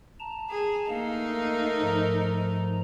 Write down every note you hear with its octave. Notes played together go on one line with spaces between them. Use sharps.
A5 A#5
G#4
A3 A#3 D#4 A#4 F5
G#2 F3 A#5